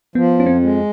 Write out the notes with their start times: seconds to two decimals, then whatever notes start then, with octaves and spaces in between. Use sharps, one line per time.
0.15 F3 B3
0.39 F2 C#4
0.46 C4
0.62 G#3